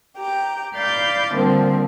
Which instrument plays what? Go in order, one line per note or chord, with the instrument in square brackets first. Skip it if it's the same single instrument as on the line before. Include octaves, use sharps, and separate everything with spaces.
[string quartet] G4 G5 A#5
D5 F5 B5 D6 G6 A6
D3 F3 G3 A#3 C4